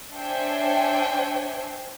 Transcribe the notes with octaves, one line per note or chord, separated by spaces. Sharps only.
D4 C5 C#5 E5 G5 G#5